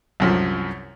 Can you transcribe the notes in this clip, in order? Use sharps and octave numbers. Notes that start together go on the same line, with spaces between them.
C2 F#2 F3